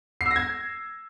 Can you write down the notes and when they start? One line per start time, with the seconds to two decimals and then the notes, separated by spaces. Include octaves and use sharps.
0.21 C7
0.26 E6
0.31 A#6
0.36 G#6